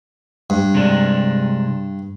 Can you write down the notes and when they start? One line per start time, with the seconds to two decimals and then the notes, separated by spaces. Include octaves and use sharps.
0.50 G2
0.74 C3 G#3 D4